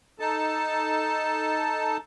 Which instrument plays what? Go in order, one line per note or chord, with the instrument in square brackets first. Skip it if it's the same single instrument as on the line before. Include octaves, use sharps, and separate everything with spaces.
[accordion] D#4 A4 A5